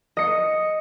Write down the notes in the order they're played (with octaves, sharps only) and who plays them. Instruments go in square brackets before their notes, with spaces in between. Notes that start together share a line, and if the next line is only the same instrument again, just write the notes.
[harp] D#5 C#7